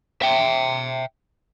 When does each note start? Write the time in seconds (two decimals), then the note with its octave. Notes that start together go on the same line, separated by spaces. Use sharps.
0.22 E5 G5